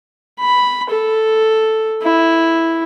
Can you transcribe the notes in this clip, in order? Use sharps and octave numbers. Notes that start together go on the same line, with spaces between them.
B5
A4
E4